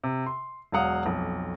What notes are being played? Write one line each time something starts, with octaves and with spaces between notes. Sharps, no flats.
C3
C6
E1 F#3 F5 F#5 D#6
B1 F2